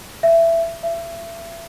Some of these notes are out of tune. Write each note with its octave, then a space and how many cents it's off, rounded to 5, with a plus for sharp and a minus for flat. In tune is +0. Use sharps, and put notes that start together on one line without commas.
E5 +15
E5 +30